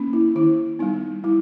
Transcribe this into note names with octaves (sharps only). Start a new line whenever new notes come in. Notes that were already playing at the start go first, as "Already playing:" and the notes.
Already playing: A#3 C#4
E4
D#3 E4
G3 B3 D#4
G3 E4